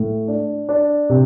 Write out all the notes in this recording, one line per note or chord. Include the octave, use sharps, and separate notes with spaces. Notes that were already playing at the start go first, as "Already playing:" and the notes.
Already playing: A2
D4
D4
C3